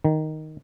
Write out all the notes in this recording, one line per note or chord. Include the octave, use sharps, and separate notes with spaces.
D#3